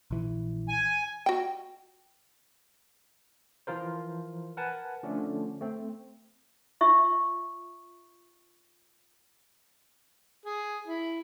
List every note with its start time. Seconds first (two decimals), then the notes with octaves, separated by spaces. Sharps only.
0.11 A#1 E3
0.69 G#5
1.26 F#4 G5
3.67 E3 F3 F4 A#4 C5
4.57 A#4 B4 F#5 G#5 A5
5.03 D3 F3 A3 C#4 D4
5.61 A3 C4
6.81 F4 E5 C#6
10.46 G#4
10.87 E4